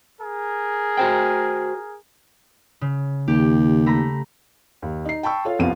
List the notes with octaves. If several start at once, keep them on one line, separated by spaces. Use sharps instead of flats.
G#4 A#4
F#4 C5 G5
C#3
D#2 G4
A3 A#5 B5
D#2
D#4 C7
G5 A5 B5 C#6 E6
F4 A4 C#5 F5
C2 F2 B3 F4 F5 D#7